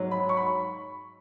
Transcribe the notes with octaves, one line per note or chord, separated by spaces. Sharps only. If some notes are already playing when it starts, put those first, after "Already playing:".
Already playing: G#2 F#3
B5
C#6
B5